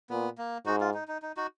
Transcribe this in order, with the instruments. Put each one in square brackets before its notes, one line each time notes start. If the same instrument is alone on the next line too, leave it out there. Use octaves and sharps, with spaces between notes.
[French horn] A#2 [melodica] B3
[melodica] A#3
[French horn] G#2 [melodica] D#4 F#4
[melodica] F4
D#4
D#4
D#4
D#4 F#4